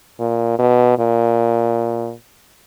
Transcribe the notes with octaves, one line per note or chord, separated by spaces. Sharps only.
A#2
B2
A#2